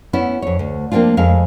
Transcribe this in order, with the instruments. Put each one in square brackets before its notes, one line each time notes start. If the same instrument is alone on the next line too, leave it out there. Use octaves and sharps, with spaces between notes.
[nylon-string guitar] B3 C#4 E4
F2 C#5
D2
F3 A#3 C4 D4 F4
F2 G#3 F5